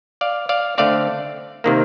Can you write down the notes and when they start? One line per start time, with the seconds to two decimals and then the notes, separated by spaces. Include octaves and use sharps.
0.21 D5 F5
0.49 D5 F5
0.78 D3 A3 C4 D5 F5
1.64 C3 D#3 A#3